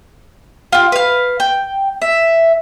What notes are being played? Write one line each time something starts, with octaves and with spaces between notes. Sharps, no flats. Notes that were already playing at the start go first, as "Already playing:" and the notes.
F4 G4
B4 F5
G5
E5